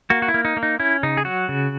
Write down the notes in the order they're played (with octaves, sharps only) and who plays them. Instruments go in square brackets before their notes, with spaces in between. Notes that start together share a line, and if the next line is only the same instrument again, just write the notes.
[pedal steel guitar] A#3 F#4
F#4
E4
A#3
D#4
A#3
D#4
C#4 E4
C#3 D#4
G#4
F#3 F#4
C#3